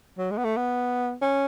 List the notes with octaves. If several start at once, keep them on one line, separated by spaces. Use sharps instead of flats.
F#3
G#3
B3
A3
B3
C#4